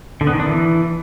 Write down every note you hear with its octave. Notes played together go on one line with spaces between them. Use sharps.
D3
B3
D#3
D4
E3